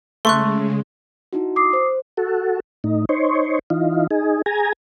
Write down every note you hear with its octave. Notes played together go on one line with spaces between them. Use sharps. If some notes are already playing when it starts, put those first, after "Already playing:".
C#3 G#3 A3 C6 C#6 F#6
D#4 E4 F#4
D6 D#6 C7
C5
F#4 A4
A2 D#4
D#4 C5 C#5
E3 D#4 F4
D#4 G#4
G#4 G#5 A#5